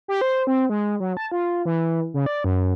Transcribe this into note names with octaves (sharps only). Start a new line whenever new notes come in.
G4
C5
C4
G#3
F#3
A5
F4
E3
C#3
D5
F#2